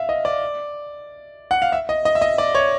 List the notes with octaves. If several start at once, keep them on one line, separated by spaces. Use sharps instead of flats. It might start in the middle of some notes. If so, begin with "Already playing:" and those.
Already playing: E5 F5
D#5
D5
F#5
F5
E5
D#5
D#5
E5
D#5
D5
C#5